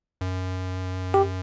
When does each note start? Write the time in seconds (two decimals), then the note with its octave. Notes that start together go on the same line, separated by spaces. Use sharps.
0.21 F#2
1.14 G4